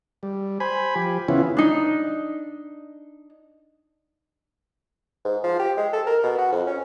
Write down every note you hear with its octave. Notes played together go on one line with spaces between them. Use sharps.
G3
C5 G#5 B5
F3 G4
C#3 E3 B3 C#4 E4 F4
D4 D#4
G#2
F3
G4
G#3
A4
A#4
B2
F#4
F2
C#4